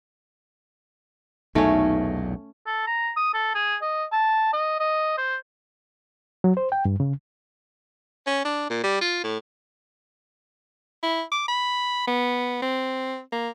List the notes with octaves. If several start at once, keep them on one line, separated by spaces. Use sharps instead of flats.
B1 E2 A#2 A3 C#4 D#4
A4
A#5
D#6
A4
G#4
D#5
A5
D#5
D#5
C5
F#3
C5
G5
G2
C#3
C#4
D4
A#2
G3
F4
A2
E4
D6
B5
B3
C4
A#3